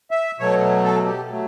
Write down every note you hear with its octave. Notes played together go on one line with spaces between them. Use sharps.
E5
B2 F#3 A3 C#5
A4
G4
F#3 A3